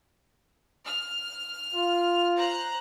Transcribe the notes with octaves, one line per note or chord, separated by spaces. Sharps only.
F6
F4
C5 A#5 F#6